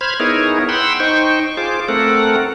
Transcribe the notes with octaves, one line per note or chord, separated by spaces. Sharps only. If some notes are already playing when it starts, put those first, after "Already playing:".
C5 B5 F6 G#6
B3 D#4 E4 G#4 A#4 C#5
F#5 G5 B5 C6 E6
D#4 C5 G5 C#6
F4 G#4 C5 D6
A3 C4 A4 A#4 F#5